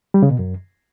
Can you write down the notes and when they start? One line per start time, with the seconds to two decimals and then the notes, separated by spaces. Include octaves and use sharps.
0.14 G3
0.22 C#3
0.31 B2
0.39 F#2